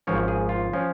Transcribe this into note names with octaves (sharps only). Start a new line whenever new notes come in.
G#1 G#2 F3 C#4 C#5
G#4
F4
F3 C#4